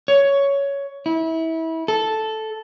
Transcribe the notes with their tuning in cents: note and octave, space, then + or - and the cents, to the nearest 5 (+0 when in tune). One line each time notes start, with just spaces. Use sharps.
C#5 +10
E4 -25
A4 -5